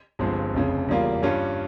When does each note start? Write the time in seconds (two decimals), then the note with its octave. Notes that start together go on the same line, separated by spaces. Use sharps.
0.19 G1 G2 F3 G#3 C4
0.54 F1 F2 C#3
0.88 E2 C#3 G3 A#3 F4
1.23 G2 G3 C#4 F4